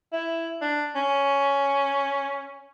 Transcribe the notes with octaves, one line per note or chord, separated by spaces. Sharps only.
E4
D4
C#4